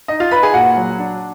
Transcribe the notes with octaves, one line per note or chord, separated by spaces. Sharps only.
D#4 D#5
F4 F5
D#4 B4 B5
G#4 G#5
A#2 F#4 F#5
F#3
D4